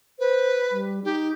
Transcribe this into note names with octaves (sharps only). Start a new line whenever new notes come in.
B4 C5
G3
D#4 G4